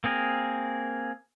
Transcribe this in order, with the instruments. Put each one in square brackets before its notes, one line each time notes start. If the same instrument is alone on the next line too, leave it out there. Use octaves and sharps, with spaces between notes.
[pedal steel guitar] A#3 C4 G#4 A#4